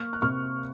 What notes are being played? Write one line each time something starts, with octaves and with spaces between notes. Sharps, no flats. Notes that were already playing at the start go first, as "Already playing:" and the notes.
Already playing: A#3 C#6 F6
F#6
C3 C#6 F6